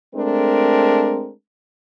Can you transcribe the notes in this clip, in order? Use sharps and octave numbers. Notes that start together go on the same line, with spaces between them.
G#3 A3 C4 D4 A#4